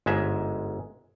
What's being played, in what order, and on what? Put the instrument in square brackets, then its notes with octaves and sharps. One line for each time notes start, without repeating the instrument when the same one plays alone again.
[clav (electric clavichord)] G1 G#2 G#3 E5